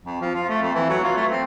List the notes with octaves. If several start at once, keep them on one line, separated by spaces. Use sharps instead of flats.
F2
F3
F4
A3
F2
E3
F#3
F4
A3
C4